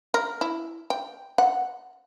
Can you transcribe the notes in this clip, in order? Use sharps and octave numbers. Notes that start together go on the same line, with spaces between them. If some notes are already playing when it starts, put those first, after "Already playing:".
A#4
E4
G5
F#5